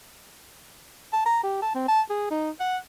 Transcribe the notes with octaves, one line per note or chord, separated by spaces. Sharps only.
A5
A#5
G4
A5
C4
A5
G#4
D#4
F#5